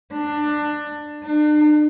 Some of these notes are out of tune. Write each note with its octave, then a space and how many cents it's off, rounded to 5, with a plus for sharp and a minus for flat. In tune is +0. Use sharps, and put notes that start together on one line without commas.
D4 +20
D4 +40